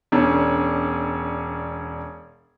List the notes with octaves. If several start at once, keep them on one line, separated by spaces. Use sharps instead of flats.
E1 C#4 D4